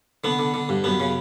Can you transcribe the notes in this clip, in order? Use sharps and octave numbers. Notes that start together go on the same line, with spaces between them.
D3 B3
D3
D3
G2
F#2 B3
C#3